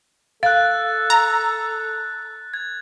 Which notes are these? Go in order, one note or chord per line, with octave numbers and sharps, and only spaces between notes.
A4 F5 F#6 A6
A#5
G#6